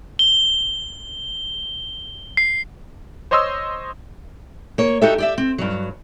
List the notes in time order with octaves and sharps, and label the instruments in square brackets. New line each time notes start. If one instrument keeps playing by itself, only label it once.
[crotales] G7
C7
[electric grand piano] C5 C#5 D#5 C6 D#6 E6
[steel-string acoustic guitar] A#3 C#5
D#4 F#4 G4 A4 E5
G4 D5 E5
C4
G2 F#3